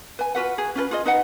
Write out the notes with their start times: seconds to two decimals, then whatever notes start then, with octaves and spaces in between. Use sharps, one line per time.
0.19 B4 G#5
0.35 F4 F#4 B4 F#5
0.58 G#4
0.75 C#4 F4 A4 B4
0.91 F4 G#4 D#5
1.06 D#4 B4 D#5 F#5